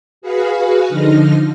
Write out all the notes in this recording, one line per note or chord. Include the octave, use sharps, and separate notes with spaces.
F#4 G#4 B4 F5
D3 F3 D#4 F6 A#6